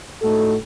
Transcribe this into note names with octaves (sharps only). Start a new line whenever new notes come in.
A2 A3 D#4 F#4 A4